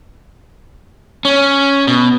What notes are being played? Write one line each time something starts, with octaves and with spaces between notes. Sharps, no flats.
C#4
B2